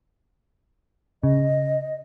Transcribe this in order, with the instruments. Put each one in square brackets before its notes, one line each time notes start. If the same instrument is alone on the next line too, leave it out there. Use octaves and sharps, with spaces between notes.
[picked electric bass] C#3 [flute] D#5